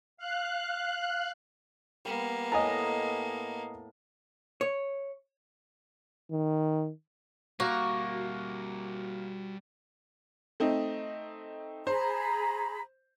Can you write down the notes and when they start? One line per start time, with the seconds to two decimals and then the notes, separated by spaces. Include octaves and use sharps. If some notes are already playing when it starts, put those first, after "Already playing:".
0.17 F5 F#6
2.05 G3 A#3 B3
2.52 A2 D#5 G#5 A#5
4.61 C#5
6.31 D#3
7.60 G3 A#3 F#4 A#4
10.60 A3 C4 D#4
11.87 G#4 C5 A#5 B5